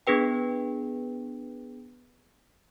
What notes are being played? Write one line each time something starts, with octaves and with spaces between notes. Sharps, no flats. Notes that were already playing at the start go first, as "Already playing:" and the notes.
B3 D4 G#4 B4 G5